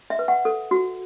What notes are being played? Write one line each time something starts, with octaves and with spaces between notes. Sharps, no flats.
E5
B4
F#5
A4
F#4